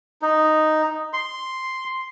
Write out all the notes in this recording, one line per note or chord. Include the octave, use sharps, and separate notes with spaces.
D#4
C6